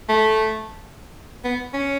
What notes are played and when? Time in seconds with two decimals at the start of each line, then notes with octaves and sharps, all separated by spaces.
0.09 A3
1.45 B3
1.74 C#4